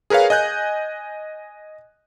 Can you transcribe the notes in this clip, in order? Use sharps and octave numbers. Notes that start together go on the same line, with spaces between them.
G#4 A#4 B4 C#5 F5
D#5 G#5 F#6 G6